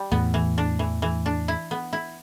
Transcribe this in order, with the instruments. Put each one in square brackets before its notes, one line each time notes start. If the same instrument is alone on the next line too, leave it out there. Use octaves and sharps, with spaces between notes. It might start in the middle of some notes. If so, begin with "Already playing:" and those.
Already playing: [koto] G3
[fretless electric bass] E2 A2 [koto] B3
[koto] E3
D4
E3
E3
D4
E4
B3
E4